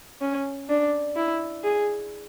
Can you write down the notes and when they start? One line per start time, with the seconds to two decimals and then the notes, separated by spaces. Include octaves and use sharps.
0.21 C#4
0.69 D4
1.16 E4
1.64 G#4